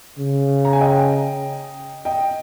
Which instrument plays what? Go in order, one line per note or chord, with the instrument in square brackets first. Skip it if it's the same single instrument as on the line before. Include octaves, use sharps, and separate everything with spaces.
[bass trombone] C#3
[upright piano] A#5
G#5
D#5 G5
D#5 G5